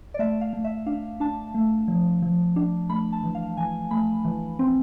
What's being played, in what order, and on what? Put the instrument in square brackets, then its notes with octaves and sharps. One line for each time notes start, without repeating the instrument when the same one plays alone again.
[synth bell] D5
A3 E5
F5
A3
E5
D4 F5
D4 A5
A3
F3
F3
D4
A3 B5
A5
E3
F5
E3 G#5
A3 B5
E3
C4